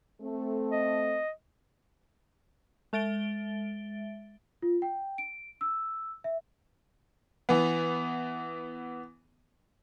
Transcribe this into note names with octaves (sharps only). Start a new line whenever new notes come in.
A3 C4 A4
D#5
G#3 E5 A6 D7 G7
F4
G5
D7
E6
E5
E3 B3